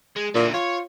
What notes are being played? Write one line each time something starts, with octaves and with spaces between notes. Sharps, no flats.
G#3
A#2 D3 E3
F4 C#5